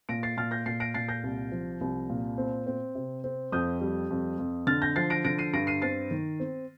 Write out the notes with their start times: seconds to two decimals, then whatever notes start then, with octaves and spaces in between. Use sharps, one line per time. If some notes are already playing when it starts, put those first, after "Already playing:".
0.09 A#2 A#6 D7
0.23 A6 C7
0.37 A#2 F6 A6
0.51 G6 A#6
0.66 A#2 A6 C7
0.80 A#6 D7
0.94 A#2 A6 C7
1.08 G6 A#6
1.23 C2
1.52 F3
1.81 C2
2.09 A#2
2.38 C4
2.67 C4
2.95 C3
3.24 C4
3.52 F2 D#6 G6
3.81 G3
4.10 F2
4.38 F2
4.67 D3 F6 A6
4.82 G6 A#6
4.96 F3 A6 C7
5.10 A#6 D7
5.25 D3 A#6 D7
5.38 C7 D#7
5.53 G2 A#6 D7
5.67 C7 D#7
5.82 C4 A6 C7
6.11 D#3
6.40 C4